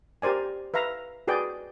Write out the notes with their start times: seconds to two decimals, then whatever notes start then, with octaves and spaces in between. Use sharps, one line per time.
0.22 G4 A#4 C5 D5 G#5
0.74 B4 E5 F5 A#5
1.28 F#4 G#4 B4 D5 G5